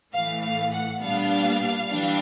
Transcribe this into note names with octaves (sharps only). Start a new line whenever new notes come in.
A2 E3 A3 F5
F5
F#5
A#2 G3 B3 D4 F5
E3 G3 D4